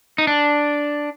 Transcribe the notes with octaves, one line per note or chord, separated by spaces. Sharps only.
D#4
D4